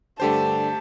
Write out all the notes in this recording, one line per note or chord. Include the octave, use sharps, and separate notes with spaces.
G2 D3 A3 G4 C5 A5